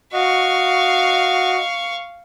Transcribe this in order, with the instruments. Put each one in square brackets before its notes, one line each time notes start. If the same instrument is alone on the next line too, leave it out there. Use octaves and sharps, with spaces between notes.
[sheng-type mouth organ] F#4 D#5 [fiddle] F5 C#6